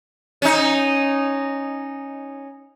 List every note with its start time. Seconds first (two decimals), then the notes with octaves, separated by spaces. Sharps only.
0.42 C#4 D#4